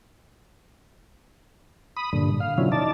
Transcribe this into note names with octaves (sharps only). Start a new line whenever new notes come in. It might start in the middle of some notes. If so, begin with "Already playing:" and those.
B5 D#6
G2 A#2 D3
F5
B2 D3 F3 F#3 C#4 E4
D#4 D5 A5